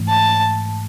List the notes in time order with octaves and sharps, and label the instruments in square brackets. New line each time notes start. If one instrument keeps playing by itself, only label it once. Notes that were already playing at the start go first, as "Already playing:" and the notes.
Already playing: [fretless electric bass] G#2 E3 A3
[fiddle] A5